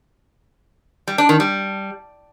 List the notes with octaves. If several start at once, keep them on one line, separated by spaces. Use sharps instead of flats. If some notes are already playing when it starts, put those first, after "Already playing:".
G3
D4
D#3
G3